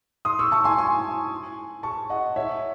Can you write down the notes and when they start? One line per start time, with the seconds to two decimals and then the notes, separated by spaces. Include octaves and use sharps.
0.25 C6 D#6
0.39 C#6 E6
0.52 A5 C#6
0.64 G#5 C6
0.78 G#5 C6
1.83 A5 C#6
2.10 D#5 F#5
2.36 C#5 E5